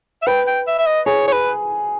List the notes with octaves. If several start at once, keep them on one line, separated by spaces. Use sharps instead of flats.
E5
B4 G5
G5
E5
E5
D#5
G#4 C#5
C#5
B4